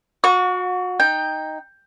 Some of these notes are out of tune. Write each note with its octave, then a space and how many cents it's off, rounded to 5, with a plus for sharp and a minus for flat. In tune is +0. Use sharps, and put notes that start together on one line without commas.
F#4 -30 C#6 +25
D#4 +0 G5 +10